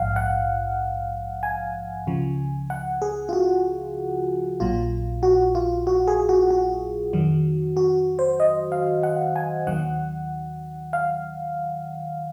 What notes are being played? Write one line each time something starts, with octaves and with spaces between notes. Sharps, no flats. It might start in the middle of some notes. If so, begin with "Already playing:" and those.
Already playing: A#1 G#2 F3 F5 F#5
F#5
G#5
C#2 C#3 F3
F#5
G#4
F4
F#4
A#1 A#2 F#3 F4
F#4
F4
F#4
G#4
F#4
F#4
F2 D#3 F#3
F#4
C5
D#5
F5
F#5
G#5
D#2 D#3 F#3 F#5
F5